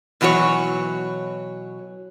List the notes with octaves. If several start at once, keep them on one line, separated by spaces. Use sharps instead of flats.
B2 E3 F#3 F#4 C#5